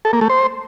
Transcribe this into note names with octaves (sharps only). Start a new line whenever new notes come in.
A4
A#3
A3
C5